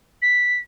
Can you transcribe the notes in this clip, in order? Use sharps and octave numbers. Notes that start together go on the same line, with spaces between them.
B6